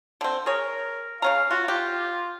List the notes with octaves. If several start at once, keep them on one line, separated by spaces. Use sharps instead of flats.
D3 C4
G#4 A#4 C#5
C#3 C#4 F5 A#5
F4 F#4
F4 G4